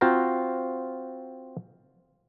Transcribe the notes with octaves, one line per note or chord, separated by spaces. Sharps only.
C4 F4 F#4 C5 F5 A#5